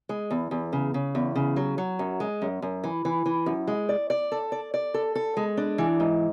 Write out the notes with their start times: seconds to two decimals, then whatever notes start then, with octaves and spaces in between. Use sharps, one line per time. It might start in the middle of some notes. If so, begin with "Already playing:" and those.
0.09 G#3
0.31 E2
0.51 E2
0.73 C#3
0.94 C#3
1.15 E2
1.35 C#3
1.56 F#3
1.78 F#3
1.99 F#2
2.20 G#3
2.42 F#2
2.62 F#2
2.84 E3
3.05 E3
3.26 E3
3.46 F#2
3.67 G#3
3.89 D5
4.10 D5
4.32 A4
4.52 D5
4.74 D5
4.94 A4
5.15 A4
5.37 G#3
5.57 D4
5.78 E3
6.00 G#2